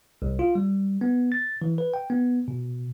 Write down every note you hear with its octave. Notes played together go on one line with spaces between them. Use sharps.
C2
F4
G3
B3
A6
E3
B4
G5
B3
B2